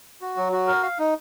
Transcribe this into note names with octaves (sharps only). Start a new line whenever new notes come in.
F#4
F#3
F#4
A#4
F5
D#4